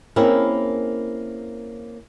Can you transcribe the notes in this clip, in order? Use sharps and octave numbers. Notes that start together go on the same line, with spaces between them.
A#3 C4 C#4 E4 G#4 A#4